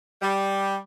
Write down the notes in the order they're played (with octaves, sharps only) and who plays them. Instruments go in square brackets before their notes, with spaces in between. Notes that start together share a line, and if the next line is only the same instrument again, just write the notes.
[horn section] G3